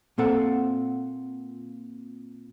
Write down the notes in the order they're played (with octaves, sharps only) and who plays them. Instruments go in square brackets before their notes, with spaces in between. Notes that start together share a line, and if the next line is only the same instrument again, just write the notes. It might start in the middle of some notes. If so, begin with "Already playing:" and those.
[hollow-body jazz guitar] A#2 C4 A4 F#5